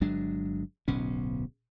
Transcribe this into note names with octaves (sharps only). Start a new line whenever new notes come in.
G1 F#3 G#3 D4
D1 B1 B2 C#4